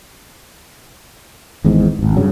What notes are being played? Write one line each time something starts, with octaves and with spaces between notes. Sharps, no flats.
G#1 E2 G#2
D#1 G#1
G2 C#3 F#3